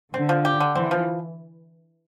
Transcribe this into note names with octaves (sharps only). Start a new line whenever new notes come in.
D3 C4
F3
G4
D3
E3 C4
F3